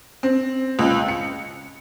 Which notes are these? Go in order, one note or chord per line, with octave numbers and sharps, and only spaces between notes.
C4
C#2
C#7